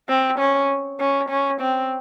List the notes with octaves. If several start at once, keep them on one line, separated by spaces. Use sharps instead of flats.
C4
C#4
C#4
C#4
C4